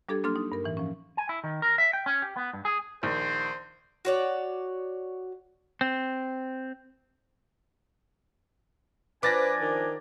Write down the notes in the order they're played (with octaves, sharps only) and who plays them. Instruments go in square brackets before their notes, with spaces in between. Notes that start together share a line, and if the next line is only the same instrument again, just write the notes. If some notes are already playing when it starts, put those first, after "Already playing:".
[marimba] G3 D4 G4 A4 G#6
F#3 A#3 D4 A4 C6 F6
D#4
G2 A#4
A2 E3
F3 C#4
[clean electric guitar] G#5
E4
D#3
A#4
E5
G5
C#4
G4
B3
G2
G#4
[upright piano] A#1 D#3 [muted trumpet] C5
[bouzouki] F#4 C#5 D5
[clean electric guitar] C4
[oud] F3 [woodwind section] D4 G#5 [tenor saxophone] B4 [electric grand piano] D6 A6 A#6
[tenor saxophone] D#3